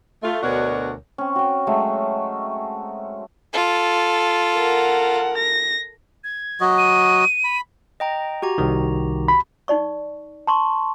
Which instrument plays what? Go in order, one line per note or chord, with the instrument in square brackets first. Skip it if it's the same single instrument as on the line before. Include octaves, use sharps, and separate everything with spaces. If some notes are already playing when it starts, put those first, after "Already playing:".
[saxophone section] A3 F4
D2 B2 D4 F#4 A#4 C#5
[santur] C4 C#4
F#4 G5
F#3 G#3 A3
[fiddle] F4 A4
[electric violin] A#4 F#5
A#6
[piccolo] G#6
[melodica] F#3 F#4 D#5
[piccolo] D#7
[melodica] B5
[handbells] D#5 G5 A#5
F#4 G4 A#5
[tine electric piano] C2 D#3
[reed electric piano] B5
[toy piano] D#4 D5 C#6
[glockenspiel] A5 C6 C#6